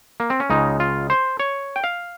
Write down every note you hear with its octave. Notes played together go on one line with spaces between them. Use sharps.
A#3
C4
C#4
C#2 C#3 G#3 D#4
F4
C5
C#5
G5
F5